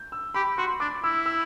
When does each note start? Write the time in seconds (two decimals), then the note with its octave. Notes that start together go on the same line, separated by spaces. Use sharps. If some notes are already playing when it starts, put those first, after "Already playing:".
Already playing: G6
0.12 E6
0.34 G4 B5
0.58 F#4 C6
0.80 D4 D6
1.04 E4 E6
1.26 E6